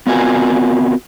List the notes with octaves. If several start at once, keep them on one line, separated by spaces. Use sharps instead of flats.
B3 C4 F4 F#4 A#4 G#5